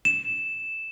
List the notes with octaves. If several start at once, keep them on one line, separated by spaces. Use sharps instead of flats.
E7